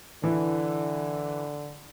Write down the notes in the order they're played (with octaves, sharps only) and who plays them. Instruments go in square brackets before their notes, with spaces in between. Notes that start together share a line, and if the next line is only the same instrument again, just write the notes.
[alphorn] D3 [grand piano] E3